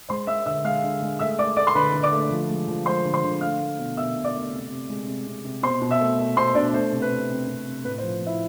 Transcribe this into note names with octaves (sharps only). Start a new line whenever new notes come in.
G#3 C5 C6
G#3 E5 E6
D3 E5 E6
G#3 F5 F6
D3
G#3
A3 E5 E6
A3 D5 D6
A3 D5 D6
C6
D3 B4 B5
D3
D5 D6
A3
F3
G#3
F3
G#3 C5 C6
D3
C5 C6
D3
A3 F5 F6
A3
B2
B2 E5 E6
B2
D5 D6
A3
C3
C3
G#3
C3
C3
C3
B2 C5 C6
B2
E5 E6
A3
A3
B2 C5 C6
B2 D4 D5
A3 C5
C3
B4
C3
C3
C3
C3
A2 B4
C5
F3
A2
E4 E5